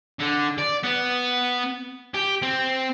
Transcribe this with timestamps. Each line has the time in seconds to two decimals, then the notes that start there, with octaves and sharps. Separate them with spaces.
0.19 D3
0.58 D5
0.83 B3
2.14 G4
2.42 C4